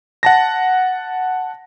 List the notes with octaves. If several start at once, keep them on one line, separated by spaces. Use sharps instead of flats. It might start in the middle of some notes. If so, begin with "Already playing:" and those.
F#5 A5 A#6